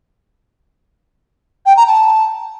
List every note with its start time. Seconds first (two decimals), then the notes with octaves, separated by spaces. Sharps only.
1.65 G5
1.76 A#5
1.87 A5